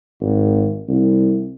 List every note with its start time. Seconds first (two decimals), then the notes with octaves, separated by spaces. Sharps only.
0.20 G#1
0.88 C2